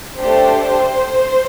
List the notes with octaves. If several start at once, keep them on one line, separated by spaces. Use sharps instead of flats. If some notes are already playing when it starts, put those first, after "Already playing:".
A3 D4 G4 C5